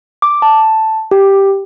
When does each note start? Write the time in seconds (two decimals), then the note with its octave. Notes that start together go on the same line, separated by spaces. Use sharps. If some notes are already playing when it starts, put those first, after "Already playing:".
0.22 D6
0.42 A5
1.11 G4